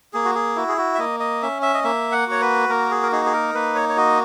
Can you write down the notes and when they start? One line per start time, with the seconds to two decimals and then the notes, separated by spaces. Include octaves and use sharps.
0.13 A#3 G#4
0.25 F#4
0.35 G#4
0.56 E4 F#4
0.68 G#4
0.78 F#4
0.95 E5
0.99 A#3 D#5
1.20 D#5
1.42 C#4 E5
1.62 E5
1.74 D#5
1.84 A#3 E5
2.12 F#5
2.27 F#4 C#5
2.41 B4
2.69 A#3 A#4
2.91 G#4
3.03 A#4
3.12 D#4 G#4
3.26 G#4
3.33 A#4
3.55 A#3 B4
3.75 C#5
3.89 C#5
3.97 F#4 D#5